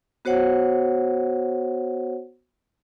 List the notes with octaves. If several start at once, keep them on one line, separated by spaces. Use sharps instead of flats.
B3 F#4 C5 C#5 F#5